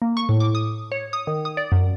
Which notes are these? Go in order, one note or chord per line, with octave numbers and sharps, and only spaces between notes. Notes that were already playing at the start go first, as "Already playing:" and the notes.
A#3
C#6
A2
D6
D#6
C#5
D#6
D#3
D#6
D5
F#2